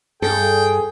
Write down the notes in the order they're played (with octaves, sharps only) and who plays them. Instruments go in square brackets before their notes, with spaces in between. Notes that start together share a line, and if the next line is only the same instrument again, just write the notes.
[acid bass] G2 [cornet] G#4 [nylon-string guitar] A4 [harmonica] G5